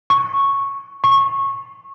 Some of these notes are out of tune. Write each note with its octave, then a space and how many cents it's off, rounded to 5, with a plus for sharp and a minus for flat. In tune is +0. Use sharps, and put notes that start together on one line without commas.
C#6 -5
C#6 -15